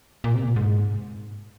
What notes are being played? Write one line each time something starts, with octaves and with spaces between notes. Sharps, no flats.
A#2
C3
A#2
G#2